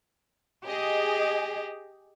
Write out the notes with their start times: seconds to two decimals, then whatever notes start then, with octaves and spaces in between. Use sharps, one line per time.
0.67 G4 G#4 D#5